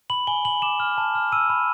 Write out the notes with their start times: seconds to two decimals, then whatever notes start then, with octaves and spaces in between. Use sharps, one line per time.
0.10 B5 F#7
0.27 G#5 G7
0.45 B5 F#7
0.62 D6 E7
0.80 F6
0.98 A5
1.15 F6
1.32 E6 D#7
1.50 B5